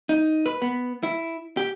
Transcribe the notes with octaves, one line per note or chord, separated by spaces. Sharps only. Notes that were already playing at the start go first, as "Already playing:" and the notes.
D#4
B4
B3
E4
G4